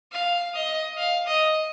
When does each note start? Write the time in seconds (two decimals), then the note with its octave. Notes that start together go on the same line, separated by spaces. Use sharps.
0.12 F5
0.55 D#5
0.98 F5
1.26 D#5